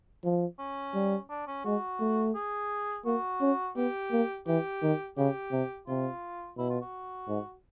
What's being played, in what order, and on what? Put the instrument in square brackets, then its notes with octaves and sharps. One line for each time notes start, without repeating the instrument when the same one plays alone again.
[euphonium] F3
[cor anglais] C#4
[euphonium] G3
[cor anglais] D4
C#4
[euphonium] G#3 [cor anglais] F#4
[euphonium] A3
[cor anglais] G#4
[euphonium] A#3 [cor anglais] F#4
[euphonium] C#4
[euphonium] B3 [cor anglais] G4
[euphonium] A#3
[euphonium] E3 [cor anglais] G4
[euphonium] D#3
[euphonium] C#3 [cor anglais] G4
[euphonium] C3
[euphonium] C3 [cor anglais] F4
[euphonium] B2 [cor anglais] E4
[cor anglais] F4
F#4
[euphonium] G#2